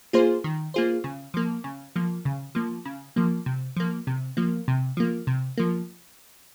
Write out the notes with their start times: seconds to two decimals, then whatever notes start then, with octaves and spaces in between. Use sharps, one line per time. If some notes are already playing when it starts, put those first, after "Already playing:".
0.13 A#3 F4 G#4 C5
0.44 D#3
0.74 A#3 F4 G#4 C5
1.04 C#3
1.34 F3 A#3
1.64 C#3
1.96 F3 A#3
2.25 C#3
2.55 F3 A#3
2.85 C#3
3.16 F3 A#3
3.46 C3
3.76 F3 A#3
4.07 C3
4.37 F3 A#3
4.68 C3
4.97 F3 A#3
5.27 C3
5.58 F3 A#3